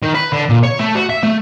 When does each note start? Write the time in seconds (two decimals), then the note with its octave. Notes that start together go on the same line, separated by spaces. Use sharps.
0.03 D#3
0.15 B4
0.33 D3
0.50 A#2
0.63 C#5
0.79 A3
0.95 F#4
1.09 E5
1.23 A3